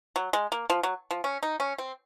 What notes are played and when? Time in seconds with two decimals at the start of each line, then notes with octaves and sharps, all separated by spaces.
0.16 F#3
0.33 G#3
0.52 A#3
0.70 F3
0.83 F#3
1.11 F3
1.24 C#4
1.43 D#4
1.60 C#4
1.78 C4